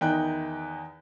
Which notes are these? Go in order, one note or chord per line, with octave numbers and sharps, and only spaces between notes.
E2 D#3 D#4 E4 G5 F#6